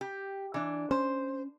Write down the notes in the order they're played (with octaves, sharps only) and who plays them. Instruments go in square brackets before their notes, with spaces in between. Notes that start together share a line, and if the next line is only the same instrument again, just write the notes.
[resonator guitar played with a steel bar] G4
E3 D4
[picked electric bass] C#4 [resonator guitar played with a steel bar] C5